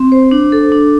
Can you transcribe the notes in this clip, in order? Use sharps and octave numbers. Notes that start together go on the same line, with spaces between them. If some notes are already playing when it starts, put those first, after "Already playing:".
Already playing: C4
C5
D4
A4
D4